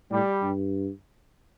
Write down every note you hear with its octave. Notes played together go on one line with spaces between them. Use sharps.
A2 G3
G2